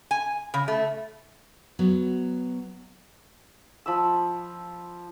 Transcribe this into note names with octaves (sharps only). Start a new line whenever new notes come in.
G#5
C#3
A3
F#3 B3
F3 B5 E6